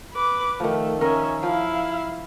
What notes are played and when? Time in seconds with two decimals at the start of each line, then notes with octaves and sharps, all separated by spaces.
0.13 B4 D6
0.60 D#3 F3 A3
1.01 C#4 A#4 D#5 E5
1.43 F3 E4 F5